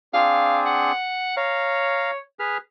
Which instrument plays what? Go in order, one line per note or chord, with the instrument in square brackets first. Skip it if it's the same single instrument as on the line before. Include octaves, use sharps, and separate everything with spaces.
[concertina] C4 D4 G#4 [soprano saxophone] F5
[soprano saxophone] F#5
[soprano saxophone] C#5 [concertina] F5 A#5
[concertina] G#4 B4 F6